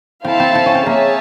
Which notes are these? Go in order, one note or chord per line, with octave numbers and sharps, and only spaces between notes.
C4 E4 A4 C5 F5 A5
C4
C4
C#4
C4
A#3 G#4 C#5 E5 A5